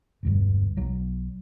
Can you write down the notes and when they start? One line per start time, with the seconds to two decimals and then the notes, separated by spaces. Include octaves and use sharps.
0.23 E1 D2 G2
0.77 B1 F#3